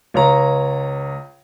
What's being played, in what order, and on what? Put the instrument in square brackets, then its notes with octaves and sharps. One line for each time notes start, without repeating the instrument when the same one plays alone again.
[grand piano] C#2 C#5 A#5